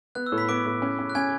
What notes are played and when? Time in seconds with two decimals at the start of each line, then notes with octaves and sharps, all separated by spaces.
0.15 B3 F#6
0.26 E6
0.32 A2
0.38 B5 B6
0.49 B3 D6 D7
0.66 A2
0.82 C#4
0.99 C#4
1.10 F#6
1.15 C#4 G#5 G#6